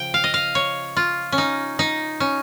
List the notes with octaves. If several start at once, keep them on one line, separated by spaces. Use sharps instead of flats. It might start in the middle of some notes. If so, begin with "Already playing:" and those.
Already playing: C#3 F3 G5
F5
D#5
F5
C#5
F4
C#4
D#4
D#4
C#4